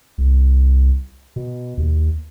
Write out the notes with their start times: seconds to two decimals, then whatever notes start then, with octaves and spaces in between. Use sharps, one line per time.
0.18 C2
1.36 B2
1.77 D#2